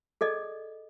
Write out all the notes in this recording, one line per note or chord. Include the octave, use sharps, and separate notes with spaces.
G#4 A4 D5 D#5